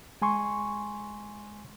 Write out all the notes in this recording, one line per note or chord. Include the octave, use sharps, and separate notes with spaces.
G#3 G#5 C6 C#6